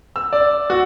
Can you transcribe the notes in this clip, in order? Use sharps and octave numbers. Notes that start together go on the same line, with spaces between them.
E6
D5
F#4